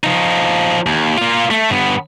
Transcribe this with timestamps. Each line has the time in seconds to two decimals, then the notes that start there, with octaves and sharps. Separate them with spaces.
0.04 F3 D#4
0.86 D#2
1.18 A#3 F4
1.51 A3
1.70 G2 B3